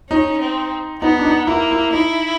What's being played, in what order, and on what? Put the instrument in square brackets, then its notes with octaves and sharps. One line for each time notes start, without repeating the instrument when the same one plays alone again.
[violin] C#4 [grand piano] D#4
[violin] C4
[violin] B3 [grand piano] D#4
[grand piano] D4
D#4
[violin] A#3 [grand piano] E4
[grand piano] E4
[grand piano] D#4 [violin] E4